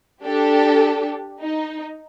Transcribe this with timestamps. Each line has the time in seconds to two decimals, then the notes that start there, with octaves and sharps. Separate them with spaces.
0.22 D4 G4 A4
1.41 D#4